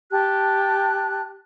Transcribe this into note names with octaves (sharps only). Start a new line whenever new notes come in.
G4 A5 F#6